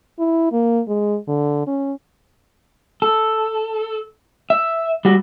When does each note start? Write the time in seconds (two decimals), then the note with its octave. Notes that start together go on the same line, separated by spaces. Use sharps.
0.19 E4
0.52 A#3
0.88 G#3
1.28 D3
1.67 C#4
3.02 A4
4.50 E5
5.05 G3 F#4